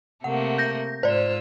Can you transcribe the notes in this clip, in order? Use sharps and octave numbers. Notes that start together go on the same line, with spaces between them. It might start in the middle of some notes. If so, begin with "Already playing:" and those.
C3 A3 A#3 F#5
G6 A#6
G#2 F4 C5 D5 E6